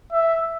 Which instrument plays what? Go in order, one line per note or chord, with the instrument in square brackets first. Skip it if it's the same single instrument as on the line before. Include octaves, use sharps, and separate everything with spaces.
[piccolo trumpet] E5